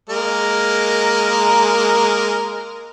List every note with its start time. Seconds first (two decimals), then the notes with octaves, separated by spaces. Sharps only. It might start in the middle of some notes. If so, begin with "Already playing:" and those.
0.10 G#3 A#3 A#4